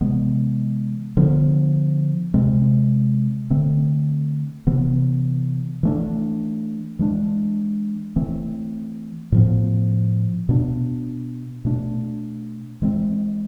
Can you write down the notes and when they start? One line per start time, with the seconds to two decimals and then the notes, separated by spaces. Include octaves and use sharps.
0.01 C3 E3 G#3 B3
1.17 D3 F3 B3
2.34 C3 G#3 C4
3.50 D3 A3 C4
4.67 C3 E3 B3
5.83 E3 A3 D4
6.99 E3 G#3 B3 D4
8.16 E3 A3 C4
9.32 A2 F3 B3
10.49 B2 B3 D4
11.65 B2 A3 D4
12.82 E3 G#3 C4